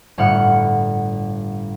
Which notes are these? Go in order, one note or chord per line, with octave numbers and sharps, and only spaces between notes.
G1 A2 F#5 F6 C#7